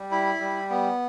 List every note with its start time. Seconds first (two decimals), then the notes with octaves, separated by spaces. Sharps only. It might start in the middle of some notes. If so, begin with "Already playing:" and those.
Already playing: G3
0.11 E4 B5
0.40 G3
0.70 B3